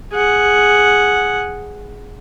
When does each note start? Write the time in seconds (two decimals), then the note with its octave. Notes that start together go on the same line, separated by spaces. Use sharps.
0.13 G#4 F#5